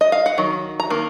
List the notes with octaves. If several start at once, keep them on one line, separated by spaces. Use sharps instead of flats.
D#5
F5
F#5
D#3 F#3
A#5
D#3 A#3